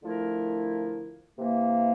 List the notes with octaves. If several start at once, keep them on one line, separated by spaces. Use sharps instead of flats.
D3 F3 A3 E4 A#4
C3 E3 A#3